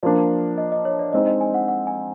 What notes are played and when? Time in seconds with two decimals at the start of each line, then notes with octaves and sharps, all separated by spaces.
0.03 F3 A#3 D4 D5
0.58 D#5
0.72 D#5
0.85 C#5
0.99 D5
1.13 G#3 C4 D#4 D#5
1.27 D#5
1.41 G#5
1.54 F#5
1.68 F#5
1.87 G#5